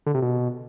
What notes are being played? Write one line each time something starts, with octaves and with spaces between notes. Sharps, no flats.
D3
C3
B2